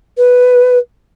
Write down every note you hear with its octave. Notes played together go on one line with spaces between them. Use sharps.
B4